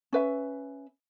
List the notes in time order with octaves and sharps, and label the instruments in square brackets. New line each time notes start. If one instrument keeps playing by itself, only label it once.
[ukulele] C#4 B4 E5